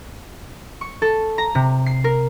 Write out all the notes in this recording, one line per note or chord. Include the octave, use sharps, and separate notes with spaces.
C#6
A4
A#5
C3
C7
A#4